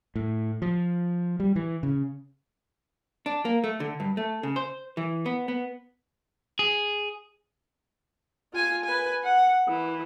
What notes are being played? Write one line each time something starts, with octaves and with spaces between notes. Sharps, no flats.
A2
F3
G3
E3
C#3
D4
A#3
A3
D3
G2
A3
C#3
C5
E3
B3
B3
G#4
F4 G#5
B4 G#5
F#5
E3